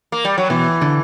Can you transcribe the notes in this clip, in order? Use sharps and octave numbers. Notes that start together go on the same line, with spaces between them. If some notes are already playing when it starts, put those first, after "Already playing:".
A#3
G3
F#3
B2 E3
D3